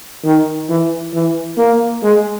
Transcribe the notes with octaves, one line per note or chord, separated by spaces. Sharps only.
D#3
E3
E3
A#3
G#3